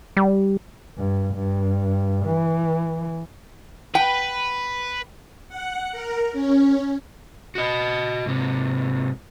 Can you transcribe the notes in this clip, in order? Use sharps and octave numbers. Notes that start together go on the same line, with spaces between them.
G3
G2
G2
E3
B4 G5
F#5
A#4
C#4
F#4 D#5
G#2 C3